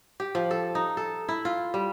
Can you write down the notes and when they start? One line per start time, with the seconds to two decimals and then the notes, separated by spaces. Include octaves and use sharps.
0.20 G4
0.35 F3
0.51 A4
0.75 D#4
0.97 A4
1.29 E4
1.45 F4
1.74 G3